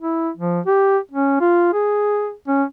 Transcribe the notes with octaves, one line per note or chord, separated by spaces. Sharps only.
E4
F3
G4
C#4
F4
G#4
C#4